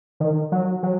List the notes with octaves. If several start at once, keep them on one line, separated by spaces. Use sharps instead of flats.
D#3
F#3
F#3